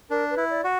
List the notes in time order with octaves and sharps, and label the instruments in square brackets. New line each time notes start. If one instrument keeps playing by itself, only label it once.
[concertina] D4 [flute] A#4
[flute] B4
[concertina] E4
[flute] D5
[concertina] F#4